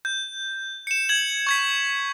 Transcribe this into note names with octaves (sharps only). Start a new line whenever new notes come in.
G6
C#7 E7
G#6 F#7
C#6 G#6 B6